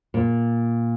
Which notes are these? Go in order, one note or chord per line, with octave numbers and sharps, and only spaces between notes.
A#2